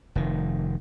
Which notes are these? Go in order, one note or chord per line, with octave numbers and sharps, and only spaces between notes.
F1 D#3